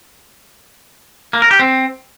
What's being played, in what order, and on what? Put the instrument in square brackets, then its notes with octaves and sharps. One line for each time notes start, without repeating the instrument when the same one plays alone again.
[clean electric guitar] A#3
A#4
G4
C4